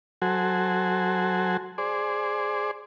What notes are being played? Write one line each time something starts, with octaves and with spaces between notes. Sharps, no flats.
F#3 F#4 A4 C5 G#5
G#4 C5 D5